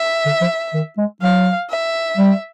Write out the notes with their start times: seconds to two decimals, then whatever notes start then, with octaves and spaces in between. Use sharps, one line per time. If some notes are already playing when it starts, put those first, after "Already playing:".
Already playing: E5
0.26 D3
0.41 F3
0.74 D#3
0.97 G#3
1.21 F#3 F5
1.69 E5
2.17 G3